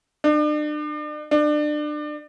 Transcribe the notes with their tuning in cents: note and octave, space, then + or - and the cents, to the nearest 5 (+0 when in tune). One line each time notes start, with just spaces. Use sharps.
D4 +40
D4 +30